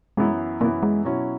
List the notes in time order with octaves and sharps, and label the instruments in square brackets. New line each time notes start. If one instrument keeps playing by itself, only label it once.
[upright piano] F#2 E3 B3 E4 [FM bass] G#3
[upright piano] F#2 E3 B3 E4 [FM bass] A#3
[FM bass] G#3
[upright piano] B2 F#3 C#4 E4